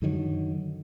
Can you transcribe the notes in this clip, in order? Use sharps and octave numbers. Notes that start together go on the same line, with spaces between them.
F#2 D3 D#3 F#3